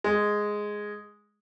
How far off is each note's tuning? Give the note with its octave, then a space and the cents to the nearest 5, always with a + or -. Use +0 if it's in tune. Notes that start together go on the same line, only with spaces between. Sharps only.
G#3 +0